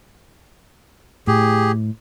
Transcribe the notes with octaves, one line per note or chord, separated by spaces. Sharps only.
A2 G4 G#4